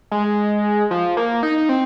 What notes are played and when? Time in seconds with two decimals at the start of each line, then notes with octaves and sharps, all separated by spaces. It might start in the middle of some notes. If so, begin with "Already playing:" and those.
0.12 G#3
0.91 F3
1.17 A#3
1.43 D#4
1.58 D#4
1.69 C4